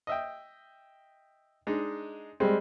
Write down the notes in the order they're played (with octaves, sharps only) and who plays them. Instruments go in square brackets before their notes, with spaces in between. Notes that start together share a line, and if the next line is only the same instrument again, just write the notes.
[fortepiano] D#5 E5 G5
G#3 D4 D#4
[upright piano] G3 G#3 [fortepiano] C4